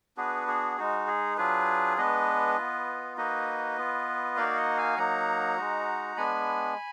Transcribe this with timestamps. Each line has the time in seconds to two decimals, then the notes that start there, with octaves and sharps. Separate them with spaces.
0.17 B3 D4 F#4 G#4 B4
0.48 G#4
0.77 G#3 D#4 F#4
1.07 G#4
1.37 F#3 D4 F4 G#4 B4
1.97 G#3 B3 D4 B4 D#5
2.57 B3 F4
3.17 A#3 D#4 F#4 B4 D#5
3.77 B3 F4
4.37 A#3 D#4 F#4 D5 F5
4.57 D#5 F#5
4.77 F5 G#5
4.97 F#3 A#3 D#4 F#5 A#5
5.57 G#3 D#4 F#4
6.17 G#3 B3 D4 G#5 B5